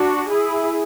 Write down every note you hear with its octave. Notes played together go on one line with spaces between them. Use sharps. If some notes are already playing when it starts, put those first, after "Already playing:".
Already playing: D4 F#4
E4 G#4